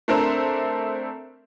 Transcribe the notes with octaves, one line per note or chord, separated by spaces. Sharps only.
A3 C4 D4 A#4 C5 E5